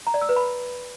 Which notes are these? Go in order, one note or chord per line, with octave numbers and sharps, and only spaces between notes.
A#5
D5
E6
B4
B5